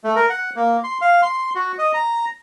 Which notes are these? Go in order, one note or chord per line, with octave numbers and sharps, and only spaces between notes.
A3
A#4
F#5
A#3
C6
F5
C6
F#4
D#5
A#5